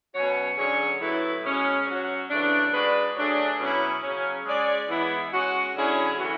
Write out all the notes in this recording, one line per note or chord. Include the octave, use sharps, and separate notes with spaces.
B2 F#3 C#4 F#4 C#5
D3 F#3 C#4 G#4 C#5
A2 F#3 A3 E4 B4
B2 G#3 C#4
F#3 C#4 F#4
C#3 E3 A3 D4
G#3 D4 F#4 B4 D5
F#3 A3 D4 G#4
B2 F#3 C#4 E4
C#3 F#3 C#4
G#3 C#4 G#4 D5
E3 G#3 B3 E4
G#3 C#4 F#4
D3 F#3 C#4 E4 G#4
E3 A3 C#4 F#4